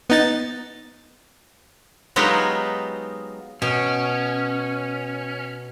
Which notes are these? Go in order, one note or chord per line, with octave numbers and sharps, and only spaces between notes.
B3 D#4 A6
F#3 G#3 B3 D#4 F4 G4
B2 C#4